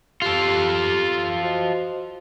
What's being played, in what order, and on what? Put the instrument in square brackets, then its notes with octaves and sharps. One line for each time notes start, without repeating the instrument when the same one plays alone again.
[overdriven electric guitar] F4 A4 [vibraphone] G4
[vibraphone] F#4 C5 D#5